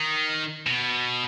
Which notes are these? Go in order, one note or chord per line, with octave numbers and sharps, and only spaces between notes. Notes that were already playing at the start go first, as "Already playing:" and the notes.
Already playing: D#3
B2